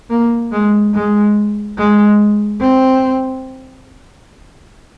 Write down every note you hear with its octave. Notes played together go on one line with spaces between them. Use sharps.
A#3
G#3
G#3
G#3
C4